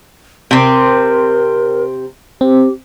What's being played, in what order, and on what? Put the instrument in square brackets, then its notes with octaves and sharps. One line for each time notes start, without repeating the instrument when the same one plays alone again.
[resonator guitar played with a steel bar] C3 C4 [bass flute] A#4
[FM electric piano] C4 [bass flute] G4